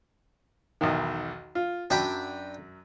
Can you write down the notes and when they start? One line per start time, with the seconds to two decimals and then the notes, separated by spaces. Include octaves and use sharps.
0.81 B1 E2 D#3
1.55 F4
1.90 F#2 F#3 D4 G5 B5